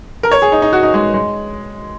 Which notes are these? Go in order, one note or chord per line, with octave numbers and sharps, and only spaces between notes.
A#4
C#5
G#4
D#4
D#4
F#4
D#4
G#3
G#3